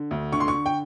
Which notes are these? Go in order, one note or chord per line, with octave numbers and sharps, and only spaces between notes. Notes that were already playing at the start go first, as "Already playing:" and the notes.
Already playing: D3
D2
D3 C#6
C6
C#6
D3
G5